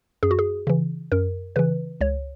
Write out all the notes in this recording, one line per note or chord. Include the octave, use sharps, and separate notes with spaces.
F#2 G#4
F#4
G#4
C#3 E3
F#2 A#4
C#3 E3 B4
C#2 C#5